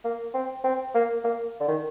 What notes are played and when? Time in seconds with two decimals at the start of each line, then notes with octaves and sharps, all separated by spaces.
0.04 A#3
0.34 C4
0.64 C4
0.95 A#3
1.24 A#3
1.60 D3
1.68 D#3